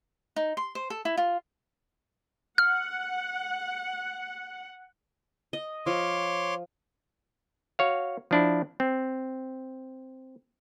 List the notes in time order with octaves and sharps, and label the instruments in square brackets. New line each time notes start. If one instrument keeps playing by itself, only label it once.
[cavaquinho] D#4
C6
C5
A4
E4
F4
[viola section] F#5 [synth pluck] F6
[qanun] D#5
[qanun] F3 [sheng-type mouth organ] C#5 C6 D6
[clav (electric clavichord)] F#4 C#5 F5
F3 D4 E4
C4